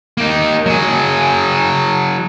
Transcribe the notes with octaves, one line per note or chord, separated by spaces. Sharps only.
A#3 D#4
F#3 G#4